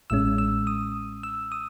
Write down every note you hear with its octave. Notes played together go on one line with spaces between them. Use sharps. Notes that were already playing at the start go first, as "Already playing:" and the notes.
A1 A2 G#3 C#4 E6
E6
D#6
E6
D#6